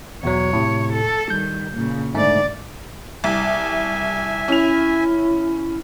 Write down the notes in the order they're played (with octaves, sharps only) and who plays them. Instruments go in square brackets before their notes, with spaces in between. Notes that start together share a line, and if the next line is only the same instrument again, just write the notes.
[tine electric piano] E2 B2 F#3 [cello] C#5
[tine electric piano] A2 C3
[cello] A4
[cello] D#3 G3 [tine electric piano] G6
[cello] A#2 C#3
[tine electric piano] G#2 A3 [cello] D3 D5
[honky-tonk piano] C2 [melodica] E5 G#5
[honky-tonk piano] C#4 F7 [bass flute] E4